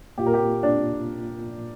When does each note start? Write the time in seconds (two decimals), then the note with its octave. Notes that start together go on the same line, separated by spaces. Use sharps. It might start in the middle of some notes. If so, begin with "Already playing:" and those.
0.18 A#2 A#3 F4 G4
0.26 A#4
0.34 G4
0.63 D4